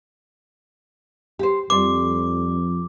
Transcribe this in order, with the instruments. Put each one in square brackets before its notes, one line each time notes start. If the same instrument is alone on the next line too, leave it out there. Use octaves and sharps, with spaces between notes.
[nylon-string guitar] G4 C5
[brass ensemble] F2 [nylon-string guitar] G3 C5 [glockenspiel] D6